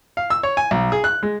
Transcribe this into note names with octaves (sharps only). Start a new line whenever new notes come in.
F5
E6
C#5
G#5
B1
G#4
F#6
G#3